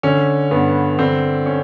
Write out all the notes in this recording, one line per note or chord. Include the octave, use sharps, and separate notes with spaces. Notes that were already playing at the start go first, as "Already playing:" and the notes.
D3 C#4
G2 B3
D3 C4
C#4